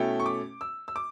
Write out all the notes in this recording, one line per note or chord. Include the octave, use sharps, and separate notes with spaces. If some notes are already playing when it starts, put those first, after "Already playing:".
Already playing: B2 A3 C#4 E4 G5
C#6
D6
E6
E6
D6